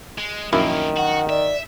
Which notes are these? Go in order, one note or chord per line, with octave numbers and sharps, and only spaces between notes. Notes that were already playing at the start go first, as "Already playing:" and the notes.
G#3
A#1 F#2 D#3 A#3 C#4 E4
F#4 F#5
D5 E5